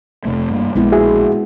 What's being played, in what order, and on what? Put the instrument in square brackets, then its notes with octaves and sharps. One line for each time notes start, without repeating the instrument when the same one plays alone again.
[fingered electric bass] F1 C3 A3
G2 A#3
[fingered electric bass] A#1 [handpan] G#3 B3 E4
[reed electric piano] F#4 G#4 E5